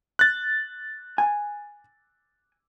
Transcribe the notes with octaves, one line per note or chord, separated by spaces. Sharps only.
F#6 A6
G#5